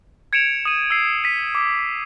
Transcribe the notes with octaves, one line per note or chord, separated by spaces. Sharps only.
G#6 C#7 D7 E7 F7
D#6 D#7
E6 C7
B6 D#7
D6